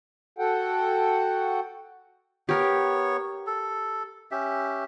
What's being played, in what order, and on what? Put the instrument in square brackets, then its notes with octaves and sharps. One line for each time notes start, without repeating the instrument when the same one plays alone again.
[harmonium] F#4 A4 F#5 G5
[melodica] B3 C#5 [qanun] G4 A#4
[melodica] A4
C#4 G4 E5